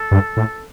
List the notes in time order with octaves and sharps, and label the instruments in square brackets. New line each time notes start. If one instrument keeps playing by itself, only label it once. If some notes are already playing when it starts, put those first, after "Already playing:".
Already playing: [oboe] A4
[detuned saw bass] G2
A2